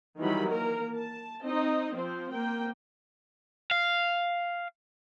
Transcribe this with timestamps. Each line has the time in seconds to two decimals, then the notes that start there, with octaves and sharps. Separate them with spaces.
0.19 D#3 E3 F#3 G3 B5
0.50 A#3 A#4
0.97 A5
1.44 C4 D#4 D#5
1.95 F3 C4 C5
2.31 A#3 C4 G5
3.71 F5